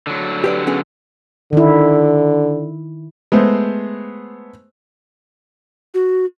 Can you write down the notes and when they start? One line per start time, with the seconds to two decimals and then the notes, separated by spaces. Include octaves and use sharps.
0.07 D3 F#3
0.44 G4 B4 D5
0.67 B3 C#4 G#4
1.53 D3 D#3 E4
3.32 G#3 A3 B3 C5
5.94 F#4